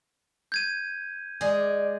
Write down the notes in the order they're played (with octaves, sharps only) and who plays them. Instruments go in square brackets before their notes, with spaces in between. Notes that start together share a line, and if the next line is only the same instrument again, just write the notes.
[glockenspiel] G6 G#6 D#7
[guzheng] G#3 G#4 [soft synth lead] D5